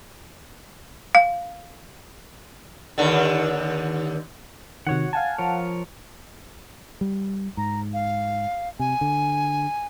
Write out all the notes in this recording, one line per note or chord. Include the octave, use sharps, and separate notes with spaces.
F5
D#2 D3
C3 D#3 F#4 C#5 F#5
F5 F#5 G#5 A5
F3 A#4 C#5
G3
G#2 A#5
F5
C3 G#5
D3